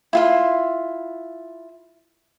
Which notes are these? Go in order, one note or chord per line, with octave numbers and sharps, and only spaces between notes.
E4 F4 C6